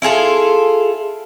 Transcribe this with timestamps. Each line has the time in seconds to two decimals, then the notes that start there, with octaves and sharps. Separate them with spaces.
0.02 E4 F4 G#4 A4